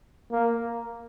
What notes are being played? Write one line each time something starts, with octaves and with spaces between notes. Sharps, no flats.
A#3